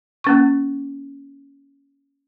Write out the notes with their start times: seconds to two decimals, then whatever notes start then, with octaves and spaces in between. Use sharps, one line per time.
0.24 A#3 C#4 C#6